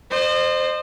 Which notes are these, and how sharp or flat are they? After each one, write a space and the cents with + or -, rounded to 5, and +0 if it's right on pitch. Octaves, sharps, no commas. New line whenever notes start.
C5 +0 D#5 -40